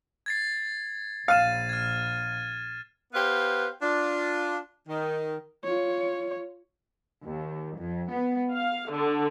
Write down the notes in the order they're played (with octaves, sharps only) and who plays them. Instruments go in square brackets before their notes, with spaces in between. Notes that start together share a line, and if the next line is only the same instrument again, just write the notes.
[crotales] G#6 A6 C7
[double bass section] A#1 [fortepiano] F5 [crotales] A6 D#7 E7
[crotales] F6 G#6
[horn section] B3 G4 B4 C5 F5
D4 F4
D#3
[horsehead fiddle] F4 C#5
[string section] D#2
F2
B3
F5
D3